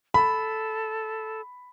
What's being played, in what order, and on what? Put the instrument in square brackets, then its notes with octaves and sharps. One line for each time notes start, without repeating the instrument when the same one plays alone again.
[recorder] A4 [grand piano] B5